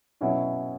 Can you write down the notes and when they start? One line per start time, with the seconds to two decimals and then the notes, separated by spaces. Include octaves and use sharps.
0.21 B2 F#3 C#4 E4